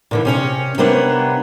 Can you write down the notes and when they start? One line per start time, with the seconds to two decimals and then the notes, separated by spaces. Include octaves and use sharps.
0.11 A#2 D3 E3
0.25 C3 C#4 C#5
0.78 C3 G3 A#3 B3 D4 C#5